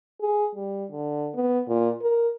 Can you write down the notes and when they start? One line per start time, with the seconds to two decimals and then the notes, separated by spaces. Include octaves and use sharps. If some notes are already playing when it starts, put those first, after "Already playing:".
0.21 G#4
0.55 G3
0.91 D3
1.34 B3
1.67 A#2
2.01 A#4